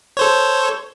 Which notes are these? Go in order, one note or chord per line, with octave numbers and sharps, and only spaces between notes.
A4 C5 C#5